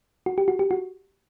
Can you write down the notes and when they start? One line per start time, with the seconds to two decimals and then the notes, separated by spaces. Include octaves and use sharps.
0.26 F#4
0.38 G4
0.48 F#4
0.59 G4
0.71 F#4